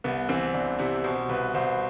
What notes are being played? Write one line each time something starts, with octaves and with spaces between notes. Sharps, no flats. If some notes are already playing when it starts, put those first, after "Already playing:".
C2 B3
E3 C4
C2 D4
C3 E4
B2 C5
C2 B4
C2 C5